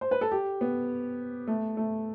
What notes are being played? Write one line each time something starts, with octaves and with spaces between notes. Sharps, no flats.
C5
B4
A4
G4
B3
A3
A3